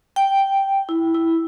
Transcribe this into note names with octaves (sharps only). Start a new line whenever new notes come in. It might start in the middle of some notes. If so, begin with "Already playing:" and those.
G5
E4
E4